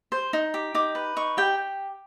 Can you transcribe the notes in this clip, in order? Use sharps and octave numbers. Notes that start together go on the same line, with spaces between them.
C5
D#4
G4
D#4 D6
B4
D#4 C#6
G4 G5